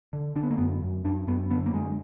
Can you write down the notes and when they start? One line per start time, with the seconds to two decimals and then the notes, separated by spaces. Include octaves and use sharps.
0.13 D3
0.36 D3 D4
0.43 B3
0.51 A#3
0.57 F#2 B3
0.82 F#2
1.05 F#2 D4
1.27 F#2 B3
1.50 D3 B3
1.66 A#3
1.73 F#2 G#3